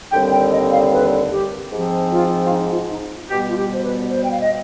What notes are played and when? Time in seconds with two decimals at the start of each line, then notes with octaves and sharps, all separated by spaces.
0.11 D#2 D3 G3 C4 G5
0.31 G5
0.52 D#5
0.71 F5
0.91 B4
1.31 G4
1.70 G#2 F3 C4
2.11 F4
2.46 F4
2.50 D#4
2.70 F4
2.90 D#4
3.30 B2 G3 B3 G4
3.49 F4
3.57 G4
3.73 C5
3.84 B4
4.09 C5
4.23 G5
4.31 F5
4.41 D#5